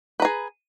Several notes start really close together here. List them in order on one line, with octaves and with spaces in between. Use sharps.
B4 A#5 G#4